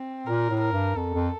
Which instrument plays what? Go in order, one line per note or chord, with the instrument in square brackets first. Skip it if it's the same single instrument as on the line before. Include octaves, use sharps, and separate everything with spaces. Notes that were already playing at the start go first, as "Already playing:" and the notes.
Already playing: [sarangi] C4
[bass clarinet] A#2 [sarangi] A#4
[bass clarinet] A2
[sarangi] A#4
[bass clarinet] G2
[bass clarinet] F2 [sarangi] A4
[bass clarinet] F2